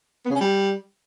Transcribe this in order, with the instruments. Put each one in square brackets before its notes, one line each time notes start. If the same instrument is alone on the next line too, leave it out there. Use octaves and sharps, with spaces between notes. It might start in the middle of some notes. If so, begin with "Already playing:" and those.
[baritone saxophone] B3
C#3
C#4
G3